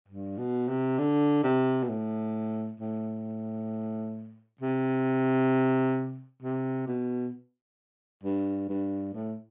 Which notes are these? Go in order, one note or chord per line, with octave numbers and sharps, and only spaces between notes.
G2
B2
C3
D3
C3
B2
A2
A2
C3
C3
B2
G2
G2
A2